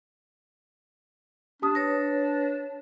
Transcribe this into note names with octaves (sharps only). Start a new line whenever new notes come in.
D4 G4 A5 D#6
B4 C#5 A#6